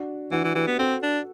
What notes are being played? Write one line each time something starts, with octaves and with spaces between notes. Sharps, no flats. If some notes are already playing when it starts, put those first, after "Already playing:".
Already playing: D4 F#4
E3 D4 F#4
E3
E3 G4 B4
B3
C4 F#4 A4
D4